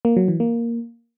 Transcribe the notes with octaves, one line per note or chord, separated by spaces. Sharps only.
A#3
F#3
E3
A#3